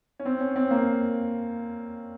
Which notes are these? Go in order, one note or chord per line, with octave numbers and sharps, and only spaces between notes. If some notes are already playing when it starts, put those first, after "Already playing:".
C#4
C4
C#4
C4
A#3